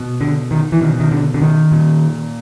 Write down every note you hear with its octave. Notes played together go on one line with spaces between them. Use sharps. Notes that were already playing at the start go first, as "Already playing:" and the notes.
Already playing: B2
D3
D#3
E3
B2 D#3
D#3
D3
D3
D#3
A#2